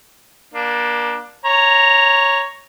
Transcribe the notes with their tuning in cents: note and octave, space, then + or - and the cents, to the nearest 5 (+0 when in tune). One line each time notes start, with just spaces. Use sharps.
A#3 +35 D4 +5
C#5 +0 A#5 +0